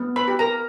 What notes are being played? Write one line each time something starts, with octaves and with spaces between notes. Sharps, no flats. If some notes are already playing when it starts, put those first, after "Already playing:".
Already playing: B3
B4 B5
G4
A#4 A#5